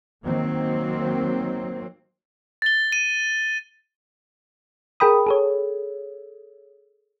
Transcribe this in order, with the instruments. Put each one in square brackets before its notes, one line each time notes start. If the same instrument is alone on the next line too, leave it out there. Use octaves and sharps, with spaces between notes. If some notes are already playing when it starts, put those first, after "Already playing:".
[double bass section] D#3 F#3 A#3 C4
[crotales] A6 G7
D#7
[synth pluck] G#4 A#4 G5 B5 D#6
G#4 A4 C#5